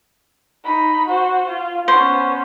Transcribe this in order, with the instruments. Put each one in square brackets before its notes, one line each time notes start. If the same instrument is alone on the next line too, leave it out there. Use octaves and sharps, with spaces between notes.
[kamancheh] D#4 B5
F#4 C5
F4
[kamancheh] B3 C#4 [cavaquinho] C5